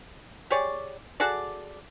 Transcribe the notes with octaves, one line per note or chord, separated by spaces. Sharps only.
G4 G#4 C#5 D5
F#4 G#4 A4 D5